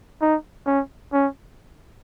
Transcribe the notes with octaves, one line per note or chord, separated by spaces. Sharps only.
D#4
C#4
C#4